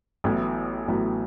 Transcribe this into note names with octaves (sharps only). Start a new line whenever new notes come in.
A1 A2 F#3 B3
A1 A2 F#3 B3